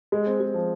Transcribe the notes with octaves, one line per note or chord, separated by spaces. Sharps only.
G#3
C4
G#3
F3